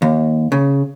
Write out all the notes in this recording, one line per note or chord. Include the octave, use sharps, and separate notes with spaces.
D#2
C#3